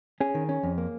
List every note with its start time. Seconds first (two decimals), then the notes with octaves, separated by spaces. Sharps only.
0.21 C#4 G#4
0.35 D#3
0.49 C#4
0.63 F2
0.78 A#3